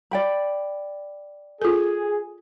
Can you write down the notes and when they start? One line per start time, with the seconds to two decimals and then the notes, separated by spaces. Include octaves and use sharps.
0.11 D5 G5 B5
1.62 F4 G#4 A4